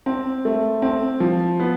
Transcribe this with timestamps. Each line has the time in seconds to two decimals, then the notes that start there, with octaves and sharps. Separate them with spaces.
0.06 C4
0.45 A3
0.82 C4
1.20 F3
1.60 B3